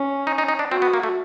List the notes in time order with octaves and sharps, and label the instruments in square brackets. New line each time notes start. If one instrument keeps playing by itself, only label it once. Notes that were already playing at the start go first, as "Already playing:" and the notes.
Already playing: [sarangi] C#4
[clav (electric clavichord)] D#4
D#4
D#4
D4
[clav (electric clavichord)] C4 [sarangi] F#4
[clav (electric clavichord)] B3
A#3
A3